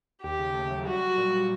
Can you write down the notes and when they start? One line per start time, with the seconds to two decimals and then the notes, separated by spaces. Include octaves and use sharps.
0.23 D#2 G4
0.39 C#3
0.54 A3
0.71 F#3
0.86 G3 F#4
1.01 G3
1.17 A#2
1.33 A#2